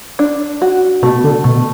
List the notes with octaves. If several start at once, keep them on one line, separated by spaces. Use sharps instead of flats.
D4
F#4
B2 A3
D3
B2 A3